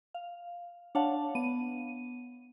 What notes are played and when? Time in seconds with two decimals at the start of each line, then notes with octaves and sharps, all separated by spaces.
0.14 F5
0.95 D4 C#5 F5 F#5 A5
1.35 B3 D#7